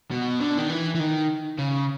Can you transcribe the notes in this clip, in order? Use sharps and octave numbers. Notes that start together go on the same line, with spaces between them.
B2
D3
D#3
E3
E3
D#3
C#3